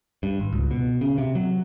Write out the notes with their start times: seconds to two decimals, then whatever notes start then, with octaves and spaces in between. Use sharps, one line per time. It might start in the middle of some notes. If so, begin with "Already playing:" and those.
0.23 G2
0.40 G#1
0.53 C#2
0.71 B2
1.01 C#3
1.18 C3
1.35 F#3